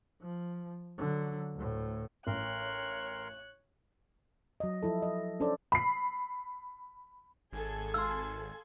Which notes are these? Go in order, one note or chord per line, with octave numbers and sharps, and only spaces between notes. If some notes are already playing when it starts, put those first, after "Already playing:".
F3
D3 F#3
D2 A2
A1 A#4 C#5 C6 F#6
F#3 D#5
F3 E4 A4
D#5
C#4 D4 A4 C5 D5
B5 C7
G#1 G#4 A4 G#6
F5 C6 E6